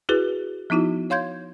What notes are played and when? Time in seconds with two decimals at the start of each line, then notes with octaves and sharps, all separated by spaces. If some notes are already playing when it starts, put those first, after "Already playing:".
0.09 E4 F#4 G#4 B4
0.70 F3 B3 D#4 E4 F#4
1.10 C#5 F5 C6 G6 G#6